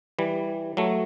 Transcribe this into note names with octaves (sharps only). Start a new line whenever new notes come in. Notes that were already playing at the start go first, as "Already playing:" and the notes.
E3 G3
F#3 A3